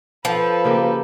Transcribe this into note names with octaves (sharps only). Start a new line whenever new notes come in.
F3 A4 B4
C#3 A#3 G4